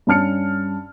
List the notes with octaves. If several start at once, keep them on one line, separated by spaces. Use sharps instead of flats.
G2 C#4 A5 F6 C#7